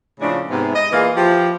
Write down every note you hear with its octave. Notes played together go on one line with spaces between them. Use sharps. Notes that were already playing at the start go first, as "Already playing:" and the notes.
A2 C#3 F3 G#3 A3 D4
G#2 C3 B3
D#5
A#2 E3 G#4 F5
F3 E4 G4